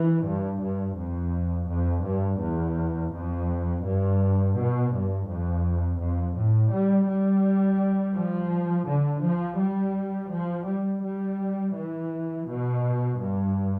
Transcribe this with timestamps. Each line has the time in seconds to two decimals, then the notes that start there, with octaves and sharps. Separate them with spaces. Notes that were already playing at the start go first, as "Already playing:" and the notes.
Already playing: E3
0.27 G2
0.63 G2
0.99 F2
1.70 F2
2.05 G2
2.41 E2
3.13 F2
3.85 G2
4.58 B2
4.93 G2
5.28 F2
6.01 F2
6.37 A2
6.73 G3
7.09 G3
8.15 F3
8.88 D3
9.23 F3
9.59 G3
10.32 F3
10.68 G3
11.03 G3
11.75 E3
12.47 B2
13.19 G2